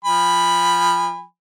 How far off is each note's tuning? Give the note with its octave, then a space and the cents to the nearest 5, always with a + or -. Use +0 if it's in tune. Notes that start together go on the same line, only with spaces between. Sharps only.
F3 +0 G#5 -30 B5 +0